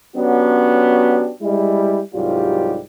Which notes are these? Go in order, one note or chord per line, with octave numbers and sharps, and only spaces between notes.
F#3 B3 C#4 D4 F#4 G4
G3 G#3 E4
C2 G#2 F#3 G3 F4 G4